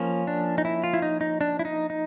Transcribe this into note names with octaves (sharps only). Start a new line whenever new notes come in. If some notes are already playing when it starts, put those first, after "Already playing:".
Already playing: F3 A#3 C#4
D4
D#4
E4
F4
E4
D#4
D#4
D4
E4
D#4
D#4